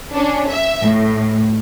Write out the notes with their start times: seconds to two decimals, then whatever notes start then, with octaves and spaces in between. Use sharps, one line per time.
0.13 C#4 D4
0.49 E5
0.82 A2